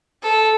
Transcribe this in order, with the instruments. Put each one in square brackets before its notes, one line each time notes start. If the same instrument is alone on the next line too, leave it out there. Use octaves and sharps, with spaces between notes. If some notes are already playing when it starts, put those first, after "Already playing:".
[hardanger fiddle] A4